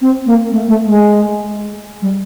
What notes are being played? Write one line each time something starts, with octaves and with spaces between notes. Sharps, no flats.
C4
A#3
A3
A3
G#3
G3